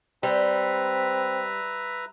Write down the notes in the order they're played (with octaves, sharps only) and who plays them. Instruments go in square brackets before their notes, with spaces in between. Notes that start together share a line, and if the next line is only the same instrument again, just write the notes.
[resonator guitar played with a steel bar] G3 [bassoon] C4 [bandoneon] B4 E5 A#5